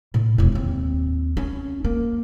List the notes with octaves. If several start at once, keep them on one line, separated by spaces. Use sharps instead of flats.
A2
E1 E4
D#2 C4
C#4
A#3